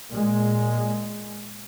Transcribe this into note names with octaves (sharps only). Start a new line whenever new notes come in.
A#2 G#3